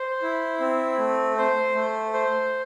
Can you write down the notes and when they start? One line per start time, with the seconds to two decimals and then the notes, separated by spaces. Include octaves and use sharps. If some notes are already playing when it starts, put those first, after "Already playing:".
Already playing: C5
0.22 E4
0.60 C4
0.98 A3
1.37 C5
1.75 A3
2.13 C5